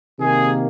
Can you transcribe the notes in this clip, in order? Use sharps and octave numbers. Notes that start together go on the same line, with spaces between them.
C3 D#3 A#3 G#4